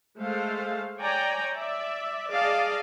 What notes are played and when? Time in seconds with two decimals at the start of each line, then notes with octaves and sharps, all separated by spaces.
0.19 G#3 A3 A4 C5 F5
0.99 C#5 D5 G5 G#5 A#5
1.53 D5 E5
2.30 G#4 D5 D#5 F5 A5